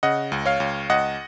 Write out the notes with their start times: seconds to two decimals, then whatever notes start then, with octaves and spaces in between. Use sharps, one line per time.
0.03 C#3 D#5 F#5
0.32 C#2
0.46 C#5 F5
0.60 C#2
0.90 C#2 D#5 F#5